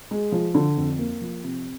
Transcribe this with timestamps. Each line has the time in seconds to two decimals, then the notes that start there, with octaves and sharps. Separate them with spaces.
0.11 G#3
0.32 F3
0.55 D3
0.77 F2
0.98 A#3
1.21 F3
1.43 C3